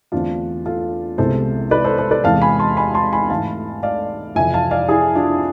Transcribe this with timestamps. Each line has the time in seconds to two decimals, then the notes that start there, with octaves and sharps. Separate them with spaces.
0.12 E2 D3 A3 C4 D4 F4
0.65 F4 A4
1.18 C2 C3 G#3 B3 A4 C5
1.71 B4 D5
1.84 A4 C5
1.98 A4 C5
2.11 B4 D5
2.24 E2 C3 E3 G#3 F5 A5
2.42 G#5 B5
2.60 A5 C6
2.77 G#5 B5
2.94 A5 C6
3.12 G#5 B5
3.30 G#2 E3 A3 F5 A5
3.83 D5 F5
4.35 F2 C3 E3 E5 G#5
4.54 F5 A5
4.71 D5 F5
4.89 E4 G#4
5.15 D4 F4